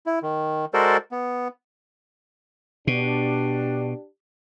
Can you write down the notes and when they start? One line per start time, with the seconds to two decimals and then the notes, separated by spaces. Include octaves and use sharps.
0.06 E4
0.23 D#3
0.74 G#3 F#4 A4 A#4 C5 D5
1.12 B3
2.87 B2 D4 G4